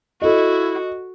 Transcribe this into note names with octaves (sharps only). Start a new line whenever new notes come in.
E4 F#4 A4 D#5